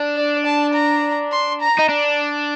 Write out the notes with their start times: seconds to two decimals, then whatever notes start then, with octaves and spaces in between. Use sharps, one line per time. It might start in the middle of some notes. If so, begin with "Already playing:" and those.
Already playing: D4
0.16 D5
0.45 A5
0.73 A#5
1.32 C6
1.61 A#5
1.79 D#4
1.89 D4